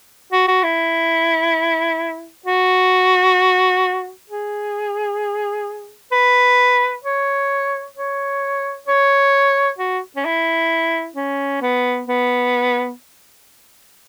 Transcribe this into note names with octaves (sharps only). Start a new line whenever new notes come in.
F#4
F#4
E4
F#4
G#4
B4
C#5
C#5
C#5
F#4
C#4
E4
C#4
B3
B3